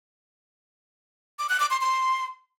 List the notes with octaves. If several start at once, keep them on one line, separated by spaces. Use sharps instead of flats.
D6
F#6
D6
C6
C6